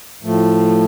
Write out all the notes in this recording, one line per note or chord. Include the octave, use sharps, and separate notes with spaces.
A2 F3 A3